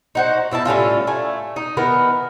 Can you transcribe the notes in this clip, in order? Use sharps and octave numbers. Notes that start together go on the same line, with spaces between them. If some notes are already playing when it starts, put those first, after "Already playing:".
D#4 F#4 C5
B2 E4 F4 A5
A2 G3 C#4 F4
A3 G#5
D#4
D#3 E3 B3 A#4